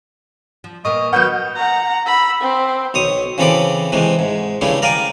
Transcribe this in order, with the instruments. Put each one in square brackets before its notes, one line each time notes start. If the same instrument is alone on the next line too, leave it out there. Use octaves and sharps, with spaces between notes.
[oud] F3
[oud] A#2 A#3 B3 [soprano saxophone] D#5 [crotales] C#6 D#6
[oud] D#3 F#3 F#4 [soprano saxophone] B3 [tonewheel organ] F#5 G6 [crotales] D#6 F6
[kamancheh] F#5 A#5
B5 E6
C4
[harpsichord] B1 C#5 D#6
C#3 E3 C4 A4 B5 D6
C3 E3 G#3 A3
G#2
G2 C#3 G3 A3 E4
A#4 D5 F5 G5 G#5